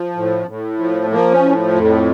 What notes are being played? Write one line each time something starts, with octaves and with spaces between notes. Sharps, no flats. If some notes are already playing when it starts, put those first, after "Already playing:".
Already playing: F3
A2
A2
F3
F3 A#3
C#4
A2
F2